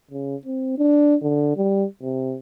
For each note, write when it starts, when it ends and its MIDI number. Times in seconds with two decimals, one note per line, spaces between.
0.11 0.36 49
0.46 0.78 60
0.78 1.15 62
1.22 1.56 50
1.57 1.85 55
2.02 2.37 48